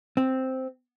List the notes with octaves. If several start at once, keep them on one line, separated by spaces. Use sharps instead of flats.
C4